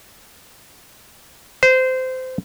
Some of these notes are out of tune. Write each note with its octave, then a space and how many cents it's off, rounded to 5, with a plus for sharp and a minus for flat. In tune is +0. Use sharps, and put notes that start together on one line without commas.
C5 -20